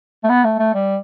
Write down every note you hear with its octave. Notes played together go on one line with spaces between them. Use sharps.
A3
B3
A3
A3
G3